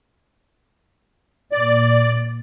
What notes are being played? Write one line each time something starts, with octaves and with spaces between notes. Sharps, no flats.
A#2 D5